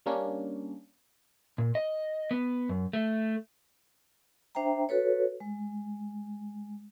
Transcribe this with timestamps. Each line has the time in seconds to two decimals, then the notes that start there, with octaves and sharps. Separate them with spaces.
0.06 G3 A#3 C#4 D4
1.58 A#2
1.75 D#5
2.31 B3
2.69 F#2
2.93 A3
4.55 D4 C5 E5 G5 A#5
4.89 F#4 A4 B4 C#5
5.40 G#3